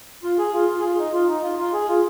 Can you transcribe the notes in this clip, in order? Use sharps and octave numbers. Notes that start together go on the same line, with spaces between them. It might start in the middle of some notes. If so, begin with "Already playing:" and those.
F4
G#4
F4
F4
G#4
F4
D#4
F4
D#4
F4
F4
G#4
F4